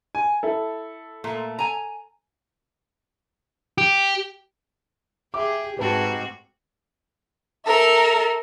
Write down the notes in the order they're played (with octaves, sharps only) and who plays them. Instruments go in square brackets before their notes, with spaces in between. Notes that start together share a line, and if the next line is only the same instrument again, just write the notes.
[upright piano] G#5
E4 A4
[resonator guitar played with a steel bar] A#2 A3
G#5 A#5
[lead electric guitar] G4
[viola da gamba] G4 G#4 [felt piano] E5 D6
[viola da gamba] G#2 C4 F#4 [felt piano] G4 B4 A5
[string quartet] A4 A#4 E5